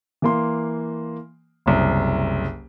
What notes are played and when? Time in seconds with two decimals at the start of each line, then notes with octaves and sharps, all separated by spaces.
0.22 E3 A#3 C6
1.66 F#1 C2